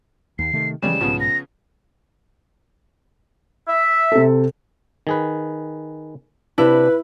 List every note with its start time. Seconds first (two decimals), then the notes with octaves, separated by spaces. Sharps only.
0.39 D#2 C7
0.53 C3 D#3 A3
0.82 C#3 E3 F3 G3 G#3 E7
1.01 B1 G#2 C#3 F3 B3
1.20 A#6
3.68 E5
4.12 C3 A4
5.07 D#3 G#4 B4
6.58 C3 D4 E4 B4